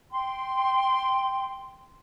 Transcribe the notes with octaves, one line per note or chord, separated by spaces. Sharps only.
G5 C6